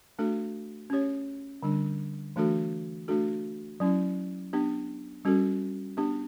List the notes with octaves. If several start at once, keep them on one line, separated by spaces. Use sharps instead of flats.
A3 D4 F#4 A4
C#4 G4 C#5
D3 G3 D4
E3 A3 D4 F#4 A4
A3 D4 F#4 A4
F#3 C#4 E4
B3 D4 G4
G3 C#4 F#4 A4
B3 D4 G4